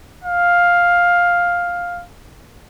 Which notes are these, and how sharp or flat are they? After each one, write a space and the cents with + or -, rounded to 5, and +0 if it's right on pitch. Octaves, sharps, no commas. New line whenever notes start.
F5 +5